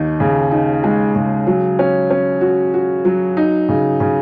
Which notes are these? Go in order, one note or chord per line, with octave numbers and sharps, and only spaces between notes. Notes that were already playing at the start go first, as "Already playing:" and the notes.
Already playing: D#2 D#4
C#3
D#4
G#3
C#3
F#3
C#4
C#4
F#4
F#4
F#3
D#4
C#3
C#3